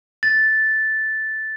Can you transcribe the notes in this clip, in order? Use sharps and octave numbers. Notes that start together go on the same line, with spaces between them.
A6